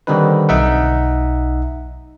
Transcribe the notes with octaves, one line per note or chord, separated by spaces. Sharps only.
D3 D#3 G3 C4 D#4 B4
B1 D#4 E5 F#5